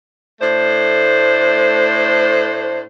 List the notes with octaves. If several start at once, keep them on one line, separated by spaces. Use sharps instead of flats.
A2 A3 D4 C5